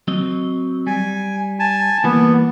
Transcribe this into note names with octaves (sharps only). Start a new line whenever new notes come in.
F#3 C4 D#5
G3 G#5
G#5 A5
E3 G3 A#3 B3